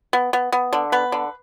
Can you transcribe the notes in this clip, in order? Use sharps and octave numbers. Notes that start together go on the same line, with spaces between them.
B3
B3
B3
D3
B3 B4
D3